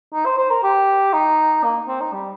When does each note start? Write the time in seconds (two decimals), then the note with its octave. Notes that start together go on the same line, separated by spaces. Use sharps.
0.14 D#4
0.26 C5
0.38 C5
0.50 A#4
0.63 G4
1.14 D#4
1.64 A#3
1.88 C4
2.01 D#4
2.13 G3